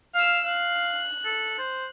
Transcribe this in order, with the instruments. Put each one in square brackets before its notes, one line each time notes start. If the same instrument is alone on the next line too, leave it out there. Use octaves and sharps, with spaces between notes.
[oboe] F5 [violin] E6 F6
[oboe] F5 [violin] F#6
[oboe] A4
C5